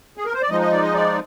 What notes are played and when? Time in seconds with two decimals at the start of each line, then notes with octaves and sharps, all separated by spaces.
0.17 G#4
0.25 A#4
0.34 C5
0.42 D5
0.50 F3 G#3 D#4 D#5
0.60 D#5
0.71 D5
0.82 D#5
0.94 D5